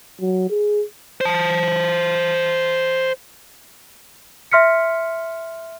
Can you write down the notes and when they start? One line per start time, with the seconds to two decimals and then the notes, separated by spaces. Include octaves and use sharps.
0.21 F#3
0.50 G#4
1.21 C5 A5
4.52 E5 C6 F6 B6 C#7